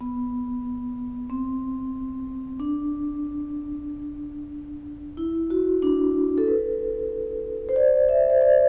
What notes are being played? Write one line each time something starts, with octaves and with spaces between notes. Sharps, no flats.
B3
C4
D4
E4
F#4
D4
A4
B4
C5
D5
E5
C5
D5